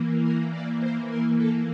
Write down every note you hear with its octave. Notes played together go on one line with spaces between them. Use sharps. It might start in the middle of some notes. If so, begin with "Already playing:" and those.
Already playing: E3 A#3
A#4
D5
C5
A#4
A4